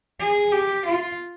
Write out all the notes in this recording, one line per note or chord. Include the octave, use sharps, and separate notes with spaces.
G#4
G4
F4